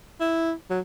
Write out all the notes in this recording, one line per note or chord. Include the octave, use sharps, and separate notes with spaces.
E4
F#3